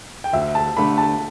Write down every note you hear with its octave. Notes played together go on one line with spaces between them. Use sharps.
G5
D2 E5
A5
D3 A3 D4 G4 B5
A5